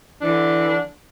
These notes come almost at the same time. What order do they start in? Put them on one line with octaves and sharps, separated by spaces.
D4 E3 D3